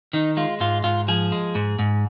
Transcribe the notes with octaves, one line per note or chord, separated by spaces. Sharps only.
D#3 D#4
G#3 F4
G#2 F4
G#2 F4
F3 G#4
G#3
G#2
G#2